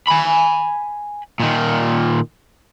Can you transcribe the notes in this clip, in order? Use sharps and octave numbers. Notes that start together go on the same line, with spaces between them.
G#5 B5
A#2 D#3